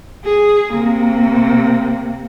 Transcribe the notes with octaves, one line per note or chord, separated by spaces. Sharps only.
G#4
C3 A#3